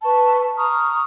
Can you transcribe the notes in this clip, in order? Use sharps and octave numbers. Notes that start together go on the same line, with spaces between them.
B4 A5 C#6
A#5 C#6 D#6 F6